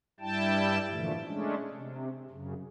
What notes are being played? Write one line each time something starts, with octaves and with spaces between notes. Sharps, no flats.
G2 G3 E4 G5 A5
A#2 D3 E3 F3 A3
G#3 A3 C#4 D4
C3
F#2 C#3